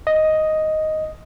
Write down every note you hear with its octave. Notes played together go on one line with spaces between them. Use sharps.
D#5